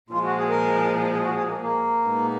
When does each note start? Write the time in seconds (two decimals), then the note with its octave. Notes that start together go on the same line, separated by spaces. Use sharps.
0.10 A#2 F3 G#3 F4
0.23 F#4
0.35 G#4
0.48 A#4
1.10 G#4
1.22 F#4
1.34 G#4
1.45 A#3
1.58 A#3
2.07 A#2 G#3 B3 D#4